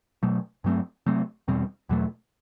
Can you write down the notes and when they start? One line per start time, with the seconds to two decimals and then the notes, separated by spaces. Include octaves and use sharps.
0.23 B2 F#3 A3
0.64 G2 F#3 A3 C4
1.06 C3 F#3 A3 C4
1.48 E2 B2 G3 C4
1.89 E2 B2 F#3 A3